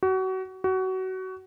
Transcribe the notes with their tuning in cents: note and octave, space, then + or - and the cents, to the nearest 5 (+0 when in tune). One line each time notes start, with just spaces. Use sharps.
F#4 +30
F#4 +25